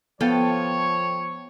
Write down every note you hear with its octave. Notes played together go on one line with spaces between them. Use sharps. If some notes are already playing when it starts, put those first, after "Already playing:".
F3 B3 A4 C#5 F5 G5